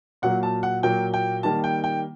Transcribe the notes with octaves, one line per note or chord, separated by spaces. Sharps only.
A#2 F#3 A#3 F#5
A5
F#5
A#2 F#3 A#3 G5
G5
D#3 G3 A#3 A5
G5
G5